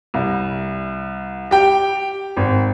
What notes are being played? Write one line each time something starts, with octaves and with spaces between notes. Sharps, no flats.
C2
G4 G5
G#1